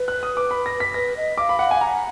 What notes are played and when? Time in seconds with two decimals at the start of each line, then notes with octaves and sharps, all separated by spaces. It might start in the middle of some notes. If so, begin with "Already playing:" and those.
Already playing: B4
0.08 F#6
0.23 D#6
0.37 D6
0.51 B5
0.66 A#6
0.80 B6
0.94 B4 A#6
1.17 D#5
1.38 F5 D6
1.49 B5
1.59 F5 F#5
1.71 F5 G#5
1.81 F#5 A#5